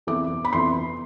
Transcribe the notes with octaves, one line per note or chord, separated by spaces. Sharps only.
F2 E3 B3 D6
B5
F2 E3 B3 C6